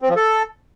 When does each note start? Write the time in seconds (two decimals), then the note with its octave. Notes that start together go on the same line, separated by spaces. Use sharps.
0.02 C4
0.09 F3
0.16 A4